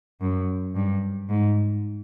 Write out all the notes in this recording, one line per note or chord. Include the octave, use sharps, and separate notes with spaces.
F#2
G2
G#2